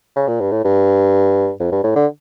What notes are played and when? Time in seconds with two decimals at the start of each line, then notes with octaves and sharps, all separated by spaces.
0.16 C#3
0.28 A#2
0.40 G2
0.52 A2
0.64 G2
1.60 F2
1.72 G2
1.84 A2
1.96 D3